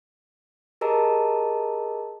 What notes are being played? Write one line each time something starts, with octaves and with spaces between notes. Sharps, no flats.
G4 G#4 A#4 D#5 A5 A#5